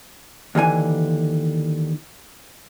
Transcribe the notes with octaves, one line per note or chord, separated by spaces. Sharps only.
D#2 D3 E3 G#5